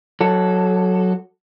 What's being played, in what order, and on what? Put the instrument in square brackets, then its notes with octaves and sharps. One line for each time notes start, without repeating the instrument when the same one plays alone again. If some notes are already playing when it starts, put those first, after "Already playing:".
[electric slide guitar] F#3 A4